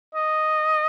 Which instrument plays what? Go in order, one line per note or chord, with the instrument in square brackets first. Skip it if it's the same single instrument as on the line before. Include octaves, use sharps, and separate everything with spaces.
[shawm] D#5